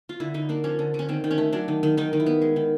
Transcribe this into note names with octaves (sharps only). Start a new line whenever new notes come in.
F4
D3 E4
D3 D#4
A#3 D4
F3 C#4
D3
D3 C#4
D#3 C4
D#3
C#4
A3
F#3 D4
D#3
D#3
D#3 D#4
D#3
E4
B3
G#3
D#3